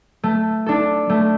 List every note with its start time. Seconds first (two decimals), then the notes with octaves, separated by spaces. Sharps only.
0.23 A3
0.66 D4 A4
1.10 A3